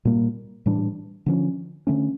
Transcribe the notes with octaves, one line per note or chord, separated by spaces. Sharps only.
A#2 G3 A#3
A2 E3 G3 D4
D3 F3 C#4
D3 A3 C#4